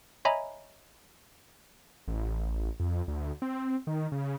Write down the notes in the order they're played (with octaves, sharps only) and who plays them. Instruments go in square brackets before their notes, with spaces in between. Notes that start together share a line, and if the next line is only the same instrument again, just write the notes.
[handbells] C#5 D#5 E5 G#5 A#5 B5
[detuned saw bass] A1
F2
D2
C4
D#3
C#3